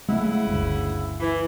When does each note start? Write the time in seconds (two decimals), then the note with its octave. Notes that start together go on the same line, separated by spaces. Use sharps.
0.08 C#3 G#3 A3 E4 F#5
0.47 G1 D2
1.20 E3